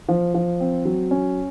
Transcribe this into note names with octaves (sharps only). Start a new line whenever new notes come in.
F3
F3
C4
F#3
C#4